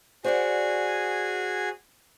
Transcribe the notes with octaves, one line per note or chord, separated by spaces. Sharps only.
F#4 G#4 C5 D5 F#5 G#5